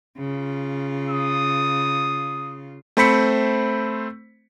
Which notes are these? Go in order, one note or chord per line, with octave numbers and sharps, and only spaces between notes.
C#3 F4
D#6
A3 C4 C5 B5 B6 C#7